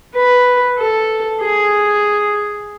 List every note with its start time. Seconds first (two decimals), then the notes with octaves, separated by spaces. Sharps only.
0.15 B4
0.78 A4
1.42 G#4